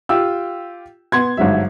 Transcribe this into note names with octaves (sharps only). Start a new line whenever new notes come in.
F4 G4 G5 E6
B3 C6 G#6
G1 G#2 F#3 E5